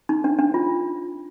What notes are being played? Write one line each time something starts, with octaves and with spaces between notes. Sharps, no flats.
D#4
D4
D4
F4